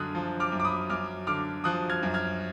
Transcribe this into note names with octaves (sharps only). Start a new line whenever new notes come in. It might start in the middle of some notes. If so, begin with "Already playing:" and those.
Already playing: F#2 D3 D#6 F6 F#6
F3
D6 F6
F#2
D6
B5 D#6
F#2 D6 F6
D3 D6 F6
F3 D#6 F#6
F6 G#6
F#2
F6 G#6